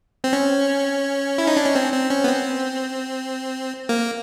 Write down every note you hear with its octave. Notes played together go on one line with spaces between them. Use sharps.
C4
C#4
E4
D#4
D4
C#4
C4
C4
C#4
B3
C4
A#3